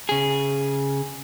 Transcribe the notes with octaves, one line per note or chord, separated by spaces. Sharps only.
C#3 G#4